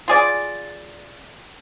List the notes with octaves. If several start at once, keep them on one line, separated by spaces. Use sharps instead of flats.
F4 G#4 D5